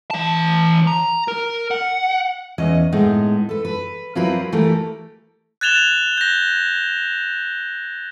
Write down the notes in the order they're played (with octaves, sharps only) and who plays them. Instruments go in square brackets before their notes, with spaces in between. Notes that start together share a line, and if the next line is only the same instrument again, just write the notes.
[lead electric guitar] E3 A5
A#5
A#4
F#5
[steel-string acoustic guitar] E2 C#4 D#5
A2 G#3 B3 D#4
A4 B4
B4
F3 F#3 C4 E4 A#4 B4
E3 A3 G4 A#4
[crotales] F#6 G#6 A6 E7 F7 G7
G6 A#6